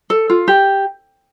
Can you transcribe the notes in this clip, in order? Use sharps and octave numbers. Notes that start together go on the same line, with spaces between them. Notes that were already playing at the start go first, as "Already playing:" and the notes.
A4
F4
G4